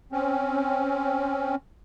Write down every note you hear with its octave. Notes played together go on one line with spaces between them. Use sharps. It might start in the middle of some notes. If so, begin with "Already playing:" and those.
C4 C#4